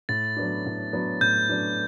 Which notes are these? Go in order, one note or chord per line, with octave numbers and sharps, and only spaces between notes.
A2 A6
F#3 B3 D4
A2
F#3 B3 D4
A2 G6
F#3 B3 D4